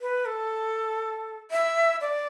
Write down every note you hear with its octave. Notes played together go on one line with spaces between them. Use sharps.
B4
A4
E5
D5